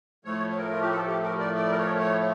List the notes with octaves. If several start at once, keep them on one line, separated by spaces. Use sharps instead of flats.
A2 F3 A3 C#5
C#5
A#4
F4
G4
A4
G4
A#4
D5
D5
A#4
C#5
C#5